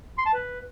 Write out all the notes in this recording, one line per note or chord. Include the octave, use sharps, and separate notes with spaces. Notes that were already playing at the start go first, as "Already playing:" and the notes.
C6
A5
B4